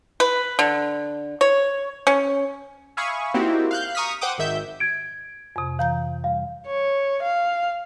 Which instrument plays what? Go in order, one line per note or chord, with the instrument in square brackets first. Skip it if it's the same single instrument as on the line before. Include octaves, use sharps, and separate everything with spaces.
[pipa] B4
D3
C#5
C#4
[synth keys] E5 F5 G#5 B5 C#6 D#6
A#3 C4 D#4 E4 F#4 G4
F5 F#6 G6
A#5 C#6 D#6 F6 B6
C5 F#5 G5 D6 D#6
G#1 D#3 E5 G6
[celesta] G#6 D7
[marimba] F2 C3
[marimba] E3 A#5 G6 [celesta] F5
[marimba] G3 [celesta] F5
[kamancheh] C#5
F5